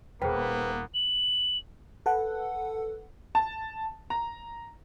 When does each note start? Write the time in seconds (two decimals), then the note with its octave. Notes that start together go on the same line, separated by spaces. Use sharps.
0.22 D#1 A#3 B3 G#4 B4 C5 G5
0.94 F#7
2.06 A4 B4 F#5
3.35 A5
4.10 A#5